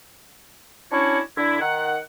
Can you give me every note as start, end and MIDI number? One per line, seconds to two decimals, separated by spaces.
0.92 1.20 61
0.92 1.20 62
0.92 1.20 64
0.92 1.20 66
0.92 1.20 73
1.37 1.59 50
1.37 1.59 64
1.61 1.98 51
1.61 1.98 78